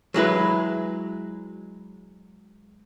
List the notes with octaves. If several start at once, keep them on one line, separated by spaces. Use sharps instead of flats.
F#3 G#3 E4 B4